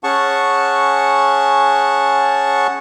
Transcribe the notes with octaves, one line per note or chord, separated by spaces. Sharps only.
C#4 G#4 F#5 A5 C#6